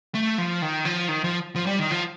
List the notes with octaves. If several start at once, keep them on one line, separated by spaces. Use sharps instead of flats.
A3
F3
D#3
F3
D#3
F3
F3
G3
D#3
F3